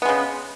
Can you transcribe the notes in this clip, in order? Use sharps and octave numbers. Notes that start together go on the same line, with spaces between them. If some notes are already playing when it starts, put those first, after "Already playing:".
C#3 G#3 B3